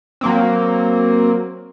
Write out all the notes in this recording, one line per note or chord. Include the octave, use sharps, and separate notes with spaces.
F#3 A#3 C4